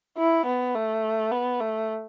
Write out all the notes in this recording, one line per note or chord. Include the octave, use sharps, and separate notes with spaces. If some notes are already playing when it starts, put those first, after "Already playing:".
E4
B3
A3
B3
A3